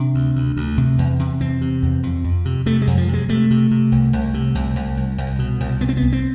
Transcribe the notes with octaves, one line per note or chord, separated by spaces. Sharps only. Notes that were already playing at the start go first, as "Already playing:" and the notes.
Already playing: C3 D4
D2
D2
D2
C3
E2
C3
E2 C4
C3
E2
F2
F2
C3
C3 A3
G#3
F2
F3
C3
G#3
C3 A3
C3
C3
C2
C2
C3
C2
C2
C2
C2
B2
C2
C3 B3
C4
C2 B3
C4